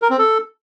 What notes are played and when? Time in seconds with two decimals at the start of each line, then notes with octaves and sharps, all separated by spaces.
0.02 A#4
0.10 C4
0.18 A4